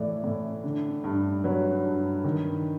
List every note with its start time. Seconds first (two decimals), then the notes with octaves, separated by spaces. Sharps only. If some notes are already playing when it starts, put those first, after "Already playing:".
Already playing: A2 E3 D5
0.24 A2
0.64 D3
1.04 G2
1.44 F#3 B4
1.85 G2
2.24 D#3